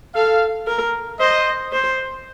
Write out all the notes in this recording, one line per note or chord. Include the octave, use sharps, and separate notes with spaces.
A4 F5
A#4
C5 D#5
C5